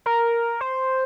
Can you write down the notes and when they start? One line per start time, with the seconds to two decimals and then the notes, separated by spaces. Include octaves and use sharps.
0.06 A#4
0.61 C5